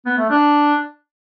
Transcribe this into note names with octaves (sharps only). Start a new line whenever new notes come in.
B3
A3
D4